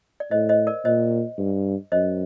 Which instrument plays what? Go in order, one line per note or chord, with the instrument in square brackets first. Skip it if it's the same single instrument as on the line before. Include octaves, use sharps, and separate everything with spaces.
[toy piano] D5
[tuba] A2 [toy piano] C5 D#5
[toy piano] C5 D#5
A#4 D5
[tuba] A#2 [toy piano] C5 D#5
[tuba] G2
[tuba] F#2 [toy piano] C5 D#5